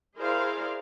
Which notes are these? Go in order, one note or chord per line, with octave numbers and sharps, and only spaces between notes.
E4 G#4 A#4 C5 D5 F5